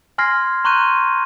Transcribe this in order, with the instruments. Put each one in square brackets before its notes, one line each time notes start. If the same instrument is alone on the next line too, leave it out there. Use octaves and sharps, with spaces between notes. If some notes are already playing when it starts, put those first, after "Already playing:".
[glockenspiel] G#5 C6 F6 G#6 A#6 C7
A#5 C6 C#6 F#6 G6 D#7